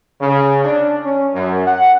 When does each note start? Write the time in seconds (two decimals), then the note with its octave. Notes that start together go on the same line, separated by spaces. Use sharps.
0.21 C#3
0.65 D4
1.05 C#4
1.34 F#2
1.67 F#5